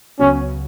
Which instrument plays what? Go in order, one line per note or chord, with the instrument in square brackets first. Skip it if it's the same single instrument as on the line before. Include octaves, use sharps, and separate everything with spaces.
[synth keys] C#2 C#3 F#3 B3 F#4 [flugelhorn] C#4